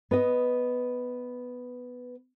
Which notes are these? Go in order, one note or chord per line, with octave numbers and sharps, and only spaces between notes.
B3 B4 D#5